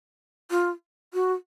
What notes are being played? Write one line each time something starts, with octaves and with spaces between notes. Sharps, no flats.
F4
F#4